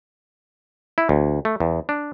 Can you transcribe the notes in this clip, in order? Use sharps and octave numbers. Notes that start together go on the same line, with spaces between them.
E4
D2
A3
E2
D4